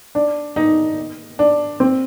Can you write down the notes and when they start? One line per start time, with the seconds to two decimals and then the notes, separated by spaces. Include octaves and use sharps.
0.15 D4
0.56 D#4
1.39 D4
1.80 C4